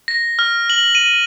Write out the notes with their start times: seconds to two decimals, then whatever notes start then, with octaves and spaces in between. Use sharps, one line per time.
0.08 A#6
0.39 F6
0.70 F#7
0.95 D#7